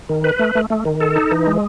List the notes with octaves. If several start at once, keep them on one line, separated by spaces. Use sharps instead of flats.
D#3
B4
A3
A3
A3
D#3
A4
D#4
E3
G#3